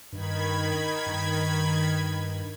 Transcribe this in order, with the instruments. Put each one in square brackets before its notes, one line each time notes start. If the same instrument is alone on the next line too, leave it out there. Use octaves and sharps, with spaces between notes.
[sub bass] G2 [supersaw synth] D#3 B5 G#6
[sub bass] G2